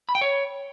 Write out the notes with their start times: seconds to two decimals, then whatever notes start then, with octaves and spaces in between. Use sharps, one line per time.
0.09 B5
0.15 G5
0.21 C#5